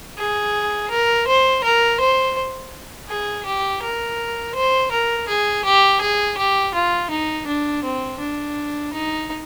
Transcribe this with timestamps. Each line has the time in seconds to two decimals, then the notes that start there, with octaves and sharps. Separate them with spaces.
0.18 G#4
0.90 A#4
1.27 C5
1.64 A#4
2.00 C5
3.09 G#4
3.46 G4
3.83 A#4
4.55 C5
4.91 A#4
5.28 G#4
5.65 G4
6.01 G#4
6.37 G4
6.74 F4
7.10 D#4
7.47 D4
7.84 C4
8.20 D4
8.93 D#4